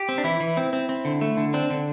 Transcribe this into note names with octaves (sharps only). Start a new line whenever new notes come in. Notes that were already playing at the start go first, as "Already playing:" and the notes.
Already playing: G4
C4
D4
E3 E4
E3
C4
C4
C4
D3
A3
D3
C4 D4
D3